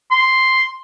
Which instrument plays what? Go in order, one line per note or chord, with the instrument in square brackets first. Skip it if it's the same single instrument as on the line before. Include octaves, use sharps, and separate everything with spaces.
[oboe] C6